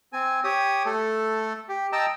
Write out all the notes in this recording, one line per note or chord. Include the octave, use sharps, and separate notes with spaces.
C4 G#5
G4 C#5 D#6
A3 A4
G4
D#5 G5 A5 A#5 E6